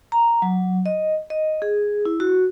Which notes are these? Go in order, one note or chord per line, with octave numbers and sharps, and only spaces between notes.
A#5
F#3
D#5
D#5
G#4
E4
F#4